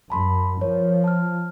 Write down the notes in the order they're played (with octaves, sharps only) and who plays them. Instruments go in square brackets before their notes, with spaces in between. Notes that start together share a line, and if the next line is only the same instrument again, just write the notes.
[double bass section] F#2 [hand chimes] A5 B5 C6
[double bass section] F3 [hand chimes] A#4 C#5
[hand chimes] A5 F6